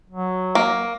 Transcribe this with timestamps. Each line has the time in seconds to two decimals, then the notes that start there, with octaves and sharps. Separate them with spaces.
0.10 F#3
0.55 A#3